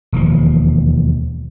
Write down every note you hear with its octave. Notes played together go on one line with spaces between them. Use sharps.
E1 D#2 F3